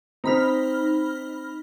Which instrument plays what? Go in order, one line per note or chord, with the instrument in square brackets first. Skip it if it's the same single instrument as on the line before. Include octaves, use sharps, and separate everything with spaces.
[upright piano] C4 A#5 [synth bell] D#4 B5 F6